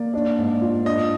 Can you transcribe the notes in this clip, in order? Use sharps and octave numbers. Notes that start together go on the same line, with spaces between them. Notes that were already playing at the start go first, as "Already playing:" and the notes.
Already playing: A#3 D5
D4
G#2
F4
D4 D#5